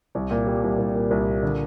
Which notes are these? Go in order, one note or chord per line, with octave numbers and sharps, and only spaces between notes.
C2
A#2
G3
C2
C2
A#2
C2
A#2
D3